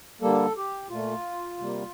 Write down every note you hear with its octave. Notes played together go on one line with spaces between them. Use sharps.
D3 G3 A#3 A4
G4
A#2 A3 F4
C3 G3 A#3